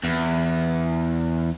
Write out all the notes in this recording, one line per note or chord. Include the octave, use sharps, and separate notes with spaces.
E2